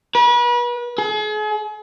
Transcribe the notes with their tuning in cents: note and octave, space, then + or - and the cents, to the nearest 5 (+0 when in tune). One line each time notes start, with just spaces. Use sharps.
B4 -35
G#4 +40